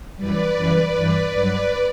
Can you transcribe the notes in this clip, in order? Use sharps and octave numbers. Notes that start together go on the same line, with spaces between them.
F#2 E3 G3 B4 D5
F#2 C#3 E3 G3
G2 E3 G3
G2 F#3